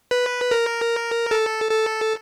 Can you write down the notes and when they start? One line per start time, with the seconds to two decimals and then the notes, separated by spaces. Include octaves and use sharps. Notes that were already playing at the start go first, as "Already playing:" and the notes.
0.11 B4
0.51 A#4
1.31 A4
1.71 A4